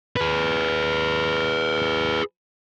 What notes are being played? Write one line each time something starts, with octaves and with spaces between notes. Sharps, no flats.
G#4 B4